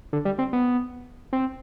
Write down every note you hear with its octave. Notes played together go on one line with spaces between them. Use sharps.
D3
G3
C4
B3
C4